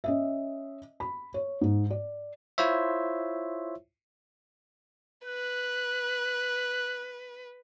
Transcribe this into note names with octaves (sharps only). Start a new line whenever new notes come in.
C#4 D#5 E5
B5
C#5
G#2
D5
E4 F4 C5 C#5 E5
B4 F#6